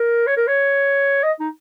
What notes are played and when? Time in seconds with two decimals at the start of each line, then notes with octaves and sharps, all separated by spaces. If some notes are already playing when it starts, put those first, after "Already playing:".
Already playing: A#4
0.27 C#5
0.37 A#4
0.48 C#5
1.23 D#5
1.40 D#4